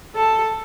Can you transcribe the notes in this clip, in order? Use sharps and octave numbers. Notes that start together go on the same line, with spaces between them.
A4